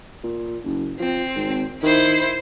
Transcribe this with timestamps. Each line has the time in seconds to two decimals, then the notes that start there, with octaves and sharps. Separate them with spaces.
0.23 A#2
0.65 F#1
0.99 F3 C4
1.36 G#1
1.83 D#3 E4 C5